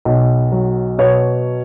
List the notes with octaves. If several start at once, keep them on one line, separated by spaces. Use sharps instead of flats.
B1
F#3
B2 C#5